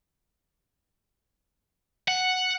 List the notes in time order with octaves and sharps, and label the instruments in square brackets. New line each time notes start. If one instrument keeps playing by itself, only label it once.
[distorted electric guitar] F#5